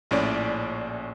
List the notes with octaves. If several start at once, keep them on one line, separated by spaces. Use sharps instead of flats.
A#1 A2 C#4 D5